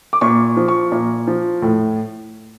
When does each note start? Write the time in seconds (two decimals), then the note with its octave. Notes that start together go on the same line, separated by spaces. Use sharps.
0.13 D6
0.21 A#2 C#6
0.57 F3
0.68 C#6
0.92 A#2
1.27 F3
1.62 A2